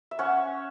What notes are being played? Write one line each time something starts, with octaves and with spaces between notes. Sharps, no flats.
E5
C#4 C#5 F#5